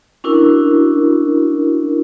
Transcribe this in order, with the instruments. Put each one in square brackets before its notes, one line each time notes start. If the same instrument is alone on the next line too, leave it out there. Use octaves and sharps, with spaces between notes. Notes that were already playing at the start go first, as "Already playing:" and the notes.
[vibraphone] C#4 D4 E4 F#4 A#4